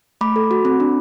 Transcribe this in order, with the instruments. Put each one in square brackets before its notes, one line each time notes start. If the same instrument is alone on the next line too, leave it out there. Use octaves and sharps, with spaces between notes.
[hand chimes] A3 B5 D6
A4
F#4
C4
D4